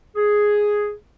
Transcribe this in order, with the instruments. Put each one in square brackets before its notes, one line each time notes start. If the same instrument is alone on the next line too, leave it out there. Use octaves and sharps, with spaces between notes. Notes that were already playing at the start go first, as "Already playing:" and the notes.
[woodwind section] G#4